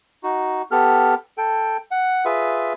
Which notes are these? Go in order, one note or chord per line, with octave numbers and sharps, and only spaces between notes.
D#4 F#4
B3 G4 A4 F6
A4 G5
F#5
F4 G#4 B4 E5